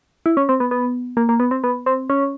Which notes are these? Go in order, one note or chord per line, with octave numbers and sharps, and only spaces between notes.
E4
C#4
C4
B3
B3
A#3
A#3
B3
C4
B3
C4
C#4